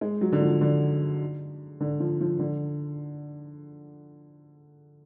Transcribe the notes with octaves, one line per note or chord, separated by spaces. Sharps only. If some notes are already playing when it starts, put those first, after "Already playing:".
G#3
F#3
D3
F3
D3
D3
F3
F3
D3